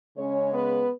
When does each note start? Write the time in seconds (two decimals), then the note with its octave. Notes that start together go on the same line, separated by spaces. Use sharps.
0.18 C#3 G#3 C#4 C#5
0.53 B3 B4